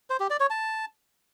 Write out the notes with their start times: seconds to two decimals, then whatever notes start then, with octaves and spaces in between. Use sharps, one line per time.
0.10 C5
0.20 G4
0.30 D5
0.40 C#5
0.50 A5